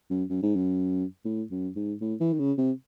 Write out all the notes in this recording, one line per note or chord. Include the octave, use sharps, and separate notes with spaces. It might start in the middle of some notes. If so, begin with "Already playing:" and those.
F#2
F#2
G#2
F#2
A2
F#2
G#2
A2
E3
D#3
C#3
C3